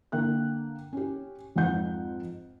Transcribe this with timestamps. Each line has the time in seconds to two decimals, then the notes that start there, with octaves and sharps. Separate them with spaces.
0.12 D3 A#3 G5 F#6
0.93 C#4 G4
1.56 F2 G#2 F4 F#5 G6